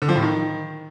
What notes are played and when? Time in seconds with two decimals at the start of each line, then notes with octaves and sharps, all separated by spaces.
0.02 D3
0.09 F3
0.16 A2
0.22 D#3